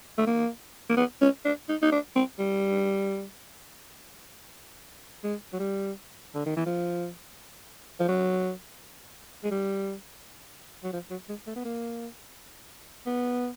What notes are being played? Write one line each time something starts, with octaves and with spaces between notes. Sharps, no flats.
A3
A#3
A#3
B3
C#4
D4
D#4
D#4
D4
C4
G3
G#3
F#3
G3
D3
D#3
E3
F3
F3
F#3
G#3
G3
F#3
F3
F#3
G#3
A3
B3
A#3
B3